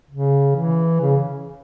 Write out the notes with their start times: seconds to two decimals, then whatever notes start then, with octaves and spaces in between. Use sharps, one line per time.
0.11 C#3
0.56 E3
1.01 C#3